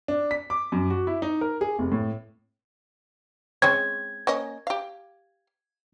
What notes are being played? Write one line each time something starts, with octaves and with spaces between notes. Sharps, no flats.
D4
B6
D6
F#2
F#4
E4
D#4
A#4
G#4
F1
A2
G#3 C4 C#4 G#6
A#3 C#4 D#5
G4 F5